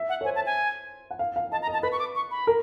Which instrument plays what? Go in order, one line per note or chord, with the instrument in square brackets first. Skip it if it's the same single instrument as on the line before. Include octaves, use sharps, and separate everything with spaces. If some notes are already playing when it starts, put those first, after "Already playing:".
Already playing: [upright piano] E5
[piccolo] F#5
[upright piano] C#5
[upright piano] C5 [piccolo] G#5
[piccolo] A5
G#5
[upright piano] F#5
F5
F5
[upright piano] D#5 [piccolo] A5
[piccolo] A#5
[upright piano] D#5
[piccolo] A5
[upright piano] B4 [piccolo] B5
[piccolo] C#6
D6
C#6
B5
[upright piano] A#4